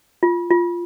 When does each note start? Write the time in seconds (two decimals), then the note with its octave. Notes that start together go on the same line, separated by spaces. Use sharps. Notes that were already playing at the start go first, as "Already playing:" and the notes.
0.23 F4
0.50 F4